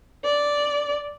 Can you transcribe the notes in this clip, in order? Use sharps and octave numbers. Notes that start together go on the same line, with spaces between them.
D5